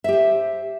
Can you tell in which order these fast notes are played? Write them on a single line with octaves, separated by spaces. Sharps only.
E5 G4 C5